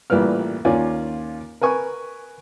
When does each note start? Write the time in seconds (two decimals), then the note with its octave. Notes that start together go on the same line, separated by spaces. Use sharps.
0.10 A1 A#2 G3 B4 F6
0.65 D#2 C#4 F4 D5 G#5
1.61 A#4 B4 G#5 C#6